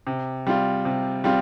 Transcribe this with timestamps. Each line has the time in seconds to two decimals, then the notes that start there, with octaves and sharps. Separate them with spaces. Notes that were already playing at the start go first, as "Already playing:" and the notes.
0.07 C3
0.47 G3 C4 F4
0.85 C3
1.24 G3 C4 F4